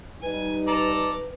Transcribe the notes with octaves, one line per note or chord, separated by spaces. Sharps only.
G3 D#4 B4 G#5
A4 D5 A#5